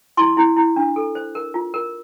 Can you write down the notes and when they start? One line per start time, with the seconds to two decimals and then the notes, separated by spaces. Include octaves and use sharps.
0.17 E4 C6
0.37 E4
0.57 E4
0.76 D4
0.96 A4
1.15 C5
1.35 A#4
1.54 F4
1.74 A#4